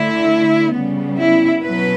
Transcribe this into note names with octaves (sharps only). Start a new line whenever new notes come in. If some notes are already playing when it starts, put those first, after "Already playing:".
Already playing: D3 A3 E4
C#3 G3 B3
E4
B2 F#3 B4